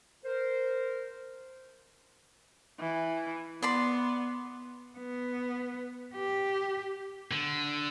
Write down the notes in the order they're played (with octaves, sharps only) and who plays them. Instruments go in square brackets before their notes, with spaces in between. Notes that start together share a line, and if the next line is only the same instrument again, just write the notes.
[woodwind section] A#4 C5
[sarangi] E3
[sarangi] B3 [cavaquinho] D5 B5 C6
[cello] B3
G4
[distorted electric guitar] D3